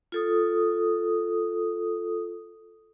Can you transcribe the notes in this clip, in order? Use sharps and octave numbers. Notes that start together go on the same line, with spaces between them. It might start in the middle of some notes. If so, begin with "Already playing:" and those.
F4 A4 D#6